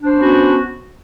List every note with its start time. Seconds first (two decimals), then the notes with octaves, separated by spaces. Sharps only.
0.01 D4
0.05 C5
0.10 C#4
0.14 B3
0.19 F#4